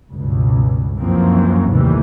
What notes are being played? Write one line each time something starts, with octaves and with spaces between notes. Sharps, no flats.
C#2 G2 B2
F#2 E3 F3 A#3 C4
A#1 D#2 A2 C3 E3 G3